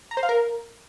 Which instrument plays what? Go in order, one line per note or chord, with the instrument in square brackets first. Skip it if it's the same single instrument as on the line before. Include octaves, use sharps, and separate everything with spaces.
[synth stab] A#5
C5
F5
A#4